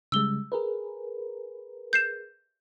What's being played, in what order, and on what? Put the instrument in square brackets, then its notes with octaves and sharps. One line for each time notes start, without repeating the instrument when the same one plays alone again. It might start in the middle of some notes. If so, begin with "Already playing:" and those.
[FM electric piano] C#3 G3 G#3 [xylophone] E6 G7
[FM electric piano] G#4 A#4 B4
[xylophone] G6 C7 E7